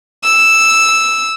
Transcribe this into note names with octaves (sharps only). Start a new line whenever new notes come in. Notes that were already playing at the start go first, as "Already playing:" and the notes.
E6